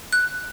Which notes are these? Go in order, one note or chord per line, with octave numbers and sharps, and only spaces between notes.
F#6